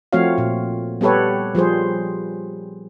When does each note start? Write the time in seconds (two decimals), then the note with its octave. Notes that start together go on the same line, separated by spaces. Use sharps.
0.13 F3 A3 C4 F#4 C#5 F5
0.38 A#2
1.01 G3 B3 G4 A4 B4 C#5
1.55 F3 G3 G#4 C5